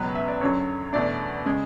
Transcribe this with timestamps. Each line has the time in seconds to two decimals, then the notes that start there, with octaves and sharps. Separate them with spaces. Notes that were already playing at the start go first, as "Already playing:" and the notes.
Already playing: C#2 B2 F#3 B3 B4
0.15 E5
0.28 D5
0.41 F#2 D3 F#3 C#4 C#5
0.93 E2 B2 A3 D4 D5
1.45 C#3 G#3